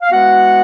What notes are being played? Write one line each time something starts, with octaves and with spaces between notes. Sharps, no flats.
F5
E3 G#3 B3 F#4 F#5